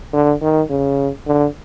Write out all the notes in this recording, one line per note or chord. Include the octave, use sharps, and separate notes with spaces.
D3
D#3
C#3
D3